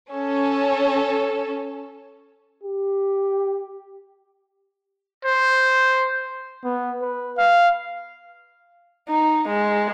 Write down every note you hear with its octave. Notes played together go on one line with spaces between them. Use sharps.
C#4 A4
G4
C5
B3
B4
F5
D#4
G#3